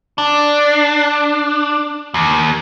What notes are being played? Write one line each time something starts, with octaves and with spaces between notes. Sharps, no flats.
D4
D#2